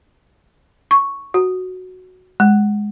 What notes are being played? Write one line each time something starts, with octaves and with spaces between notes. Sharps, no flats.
C#6
F#4
G#3